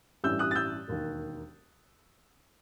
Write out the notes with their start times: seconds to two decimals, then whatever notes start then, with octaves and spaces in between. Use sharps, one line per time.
0.24 A1 G2 E3 G3 E6 G6
0.39 D#6 F#6
0.51 A6
0.55 E6 G6
0.88 E1 D#2 D#3